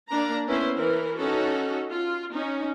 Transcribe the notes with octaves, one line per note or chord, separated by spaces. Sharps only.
A#3 D4 A#5
B3 C#4 E4 B4 C5
E3 A#4 B4
C#4 D#4 F#4 A4
F4
C#4 D#4